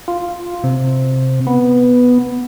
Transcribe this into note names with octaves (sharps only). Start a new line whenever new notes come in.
F4
C3
B3